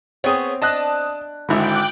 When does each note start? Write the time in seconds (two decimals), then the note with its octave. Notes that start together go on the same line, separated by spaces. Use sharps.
0.24 B3 C4 G#4 C#5 G5 D#6
0.62 D4 D#5 A5 D#6 F#6
1.49 G#1 D3 E4 G5 B5 D6 F#6